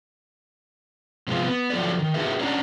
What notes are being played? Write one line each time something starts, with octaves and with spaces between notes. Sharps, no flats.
C3 F3 G#3 B3 F4
B3
F3 F#3 A4 D5
D#3
D#4 F#4 G#4 B4 E5
C#4 D4 D5 F#5 A#5